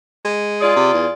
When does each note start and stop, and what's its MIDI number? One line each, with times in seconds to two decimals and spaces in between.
0.25 0.71 56
0.60 1.12 65
0.60 1.12 68
0.60 1.12 74
0.76 0.93 48
0.94 1.06 40